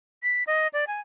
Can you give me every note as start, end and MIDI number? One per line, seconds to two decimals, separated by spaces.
0.23 0.43 95
0.47 0.67 75
0.73 0.85 74
0.87 1.00 80